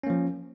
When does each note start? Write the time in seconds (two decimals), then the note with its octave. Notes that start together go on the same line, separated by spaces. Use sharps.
0.03 C#4
0.07 A#3
0.10 F3